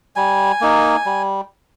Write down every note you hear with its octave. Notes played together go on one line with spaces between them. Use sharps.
G3 G#5
A#3 D#4
G3